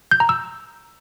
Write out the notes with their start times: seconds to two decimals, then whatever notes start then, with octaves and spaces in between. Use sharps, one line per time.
0.11 G6
0.20 A#5
0.29 E6